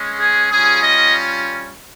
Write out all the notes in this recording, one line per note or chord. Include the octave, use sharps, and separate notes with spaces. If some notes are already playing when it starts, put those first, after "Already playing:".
Already playing: G#3 C#4
G#4
G3 C#4 F4 G#4
D#5